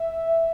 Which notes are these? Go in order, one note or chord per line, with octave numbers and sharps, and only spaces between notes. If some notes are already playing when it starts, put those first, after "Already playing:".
Already playing: E5